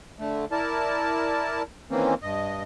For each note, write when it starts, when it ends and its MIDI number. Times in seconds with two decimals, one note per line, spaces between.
0.19 0.45 50
0.19 0.45 57
0.52 1.62 64
0.52 1.62 70
0.52 1.62 74
0.52 1.62 81
1.91 2.14 51
1.91 2.14 52
1.91 2.14 58
1.91 2.14 60
1.91 2.14 61
2.22 2.63 43
2.22 2.63 75